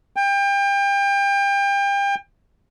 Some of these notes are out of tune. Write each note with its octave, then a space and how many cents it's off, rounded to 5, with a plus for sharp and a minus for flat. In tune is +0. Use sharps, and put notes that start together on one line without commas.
G5 +30